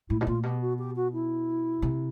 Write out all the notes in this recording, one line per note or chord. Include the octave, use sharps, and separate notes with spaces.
A2 E4
B2 E4
A#2 F4
B2 G4
F#4
G4
F#4
E4
C3